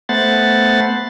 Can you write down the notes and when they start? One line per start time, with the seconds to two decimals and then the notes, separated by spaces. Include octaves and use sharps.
0.09 A3 B3 C5 F#5 A6